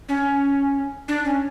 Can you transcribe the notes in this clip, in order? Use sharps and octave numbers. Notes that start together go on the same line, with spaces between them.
C#4
D4
C#4